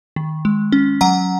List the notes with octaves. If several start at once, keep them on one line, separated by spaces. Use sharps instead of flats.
D#3
G#3
C#4
F#3 F#5 A#5